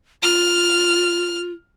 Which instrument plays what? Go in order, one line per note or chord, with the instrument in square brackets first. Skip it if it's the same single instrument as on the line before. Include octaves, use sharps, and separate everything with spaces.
[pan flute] F4 [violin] F6